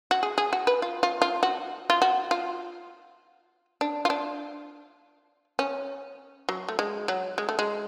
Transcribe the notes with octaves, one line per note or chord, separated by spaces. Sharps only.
F#4
G#4
G#4
F#4
B4
F4
F4
F4
F#4
F4
F#4
F4
D4
F4
D4
C#4
F#3
A3
G#3
F#3
G#3
A3
G#3